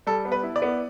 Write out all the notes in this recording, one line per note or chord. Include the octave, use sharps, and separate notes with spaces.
G3 A4
B3
B4
E4
D5
B3